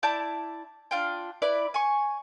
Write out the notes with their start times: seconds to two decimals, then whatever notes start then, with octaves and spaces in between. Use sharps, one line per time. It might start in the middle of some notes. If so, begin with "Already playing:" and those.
0.03 E4 D5 A5 G6
0.91 D4 F4 G5
1.42 E4 B4 D5
1.74 G#5 C#6